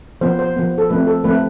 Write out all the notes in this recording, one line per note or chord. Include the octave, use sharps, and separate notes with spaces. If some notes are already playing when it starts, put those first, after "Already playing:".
F3 B3 C5
C5
F3 B3
A4
F3 A3 C4 B4
A4
F3 A3 C4 B4